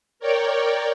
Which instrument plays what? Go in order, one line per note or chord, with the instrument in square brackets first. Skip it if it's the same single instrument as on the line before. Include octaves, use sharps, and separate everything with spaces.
[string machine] A#4 C#5 D5 G5